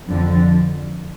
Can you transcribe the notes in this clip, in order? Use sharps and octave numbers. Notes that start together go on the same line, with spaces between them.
F2 D3 F3